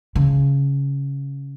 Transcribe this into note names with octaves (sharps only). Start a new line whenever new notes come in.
C#3